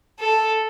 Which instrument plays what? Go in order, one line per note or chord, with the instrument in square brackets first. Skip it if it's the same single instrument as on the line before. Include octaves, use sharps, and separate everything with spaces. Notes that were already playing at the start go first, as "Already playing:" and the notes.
[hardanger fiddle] A4